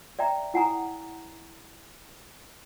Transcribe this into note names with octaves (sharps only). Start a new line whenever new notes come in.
D5 E5 G5 A#5
E4 F#5 G#5 A#5 D#6